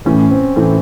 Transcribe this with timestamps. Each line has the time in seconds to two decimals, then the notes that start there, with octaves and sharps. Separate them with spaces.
0.05 A2 E3 A3 C#4
0.31 C4
0.56 A2 E3 A3 C#4